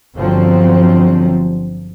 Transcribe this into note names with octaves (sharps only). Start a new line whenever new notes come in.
G1 D3 F3 F#3 C4